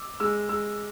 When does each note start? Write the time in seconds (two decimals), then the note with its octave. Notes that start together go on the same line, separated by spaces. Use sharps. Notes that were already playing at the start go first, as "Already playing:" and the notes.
Already playing: D6 E6
0.20 G#3 E6
0.49 G#3 E6